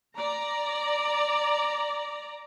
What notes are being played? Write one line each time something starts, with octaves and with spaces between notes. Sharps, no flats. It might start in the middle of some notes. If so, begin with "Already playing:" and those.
D5 A#5